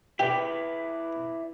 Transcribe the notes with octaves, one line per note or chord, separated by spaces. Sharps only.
E4 G4 B4 D5